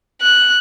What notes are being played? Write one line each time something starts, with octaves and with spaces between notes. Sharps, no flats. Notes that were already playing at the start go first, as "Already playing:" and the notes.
F#6